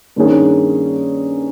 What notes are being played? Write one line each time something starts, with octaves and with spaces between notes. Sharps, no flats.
G2 D#3 A#3 C#4 G#4